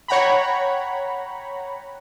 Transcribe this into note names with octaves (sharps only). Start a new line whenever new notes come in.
C#5 F#5 G5 A#5 B5